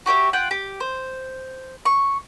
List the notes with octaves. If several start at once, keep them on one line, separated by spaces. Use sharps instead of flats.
F#4 G4 C#5 E5
F4 F#5 G5
G4
C5
C#6